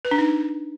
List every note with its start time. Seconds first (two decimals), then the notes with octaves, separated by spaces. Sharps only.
0.05 B4
0.11 D4
0.18 D#4